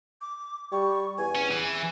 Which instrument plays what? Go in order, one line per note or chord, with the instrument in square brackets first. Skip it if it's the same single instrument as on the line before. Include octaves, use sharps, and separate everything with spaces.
[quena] D6
[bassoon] G3 [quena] C#6
[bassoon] E2 [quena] G#5
[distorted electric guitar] C#4
[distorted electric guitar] E3 [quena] G#5